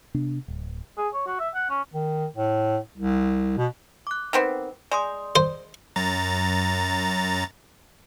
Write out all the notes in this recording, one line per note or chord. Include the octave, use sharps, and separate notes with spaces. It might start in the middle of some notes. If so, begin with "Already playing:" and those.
C3 B3 D4
D1
G#4
C#5
F#4
E5
F#5
C#4
D#3
A2
C2
B2
D6 F#6
D#3 B3 C4
G#3 D5 C6 D#6
C5
F#2 A#5 A6